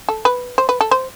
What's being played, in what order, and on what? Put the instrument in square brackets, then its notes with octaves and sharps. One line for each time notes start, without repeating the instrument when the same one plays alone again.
[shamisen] A4
B4
C5
B4
A4
C5